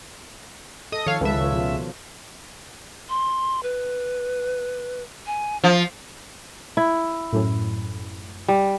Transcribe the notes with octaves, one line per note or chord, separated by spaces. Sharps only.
A4 D#5 D#6
D#3 F3 A4 C#5 F5
C#2 A4 B4 E5 F5
F4 C#5
B2 F3 F4
C6
B4
G#5
F3 F5
E4
F#2 A2
G3